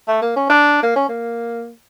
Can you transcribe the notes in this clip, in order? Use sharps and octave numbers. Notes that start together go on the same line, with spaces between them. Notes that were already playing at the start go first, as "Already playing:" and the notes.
A3
A#3
C#4
D4
A#3
C#4
A#3